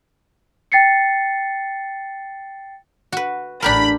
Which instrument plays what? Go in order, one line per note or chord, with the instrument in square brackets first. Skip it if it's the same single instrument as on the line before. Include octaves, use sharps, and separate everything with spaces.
[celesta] G5 A6 C7 C#7
[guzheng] F#4 B4
[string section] A1 B5 [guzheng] D4 G4 A#4